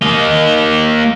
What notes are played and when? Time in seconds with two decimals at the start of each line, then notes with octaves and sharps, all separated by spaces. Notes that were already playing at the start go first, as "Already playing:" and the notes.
0.01 A#3 D#5